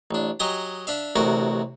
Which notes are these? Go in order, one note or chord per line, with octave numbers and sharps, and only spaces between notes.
A1 D4
F#3 G4 D#5 G#5 A#5
D4 E5 F5
A1 D2 C3 F#4 A#4